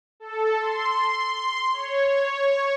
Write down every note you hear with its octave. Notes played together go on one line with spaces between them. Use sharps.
A4
C6
C#5